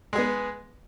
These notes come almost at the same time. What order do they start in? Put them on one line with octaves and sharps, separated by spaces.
G#3 G#4 B3